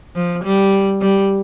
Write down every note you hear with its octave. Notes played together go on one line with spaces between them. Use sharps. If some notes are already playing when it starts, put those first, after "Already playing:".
F3
G3
G3